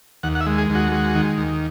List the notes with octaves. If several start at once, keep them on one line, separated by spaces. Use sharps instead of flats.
D#2 F#5
F#5
E5
G#3
G#4
D#2 F#4
G#3
D#3
D#2